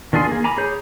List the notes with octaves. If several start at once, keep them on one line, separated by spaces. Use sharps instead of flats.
D#3 D4 F4 G#4 C6
A#3 G#4
G#5 A#5 B5 D6
G#4 C#5 G6